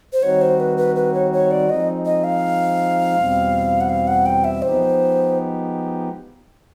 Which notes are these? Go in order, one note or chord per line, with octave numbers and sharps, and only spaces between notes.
C5
D#3 G3 C4 D#4 F#4 C#5
C5
B4
B4
B4
C#5
C#5
D5
F3 G#3 C4 D#4 D#5
D#5
F5
E2 B2 G3 C4
F#5
F5
F#5
G5
E5
F3 G#3 B3 D#4 G4 C5